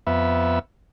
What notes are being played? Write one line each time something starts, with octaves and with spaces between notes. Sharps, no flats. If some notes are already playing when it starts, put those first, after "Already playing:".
F2 B3 E5